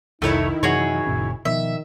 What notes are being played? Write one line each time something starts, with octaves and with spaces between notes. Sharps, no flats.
F1 C2 F2 D#3 A3 D#4 E4 C#5
F#2 C3 E3 F#4 G#4 C#5
F#1 A#2 C#4
B2 D#3 F3 B3 E5